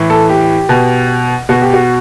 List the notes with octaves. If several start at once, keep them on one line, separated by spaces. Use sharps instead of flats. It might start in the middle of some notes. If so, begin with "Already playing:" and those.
Already playing: A2 E3
A4
G4
B2
B2 F#4
G4
F#4